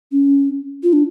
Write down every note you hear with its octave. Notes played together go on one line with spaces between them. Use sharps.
C#4
F4
D4